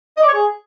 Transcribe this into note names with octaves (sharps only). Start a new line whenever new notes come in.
D#5
D5
C#5
G#4